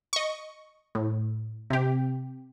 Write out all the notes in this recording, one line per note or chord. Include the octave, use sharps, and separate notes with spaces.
D#5 C#6
A2
C3 G4